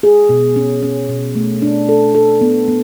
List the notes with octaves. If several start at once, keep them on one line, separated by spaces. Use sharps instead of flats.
G#4
B2
C#4
C#4
B2
A3
D4
A4
A4
B3
B3